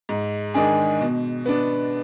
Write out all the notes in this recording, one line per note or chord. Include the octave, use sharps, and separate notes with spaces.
G#2
D#3 G#3 D4 G#4
B2
B3 D4